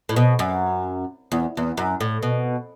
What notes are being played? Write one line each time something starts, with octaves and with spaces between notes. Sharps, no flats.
A2
B2
F#2
E2
E2
F#2
A2
B2